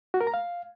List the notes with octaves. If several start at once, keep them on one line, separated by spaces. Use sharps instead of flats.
F#4
A#4
A#5
F5